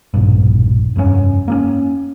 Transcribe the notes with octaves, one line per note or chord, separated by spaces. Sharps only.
E1 A#1 G2
F1 G2 C3 C#4
A#3 C4 C#4